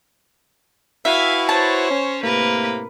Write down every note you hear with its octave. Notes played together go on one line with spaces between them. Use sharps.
E4 F#4 B4 E5 F5 G#5
C5 C#5 A5
C#4
A2 C3 A#3 A#4 B4